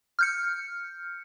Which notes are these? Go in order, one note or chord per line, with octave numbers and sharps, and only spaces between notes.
F6 G6 C#7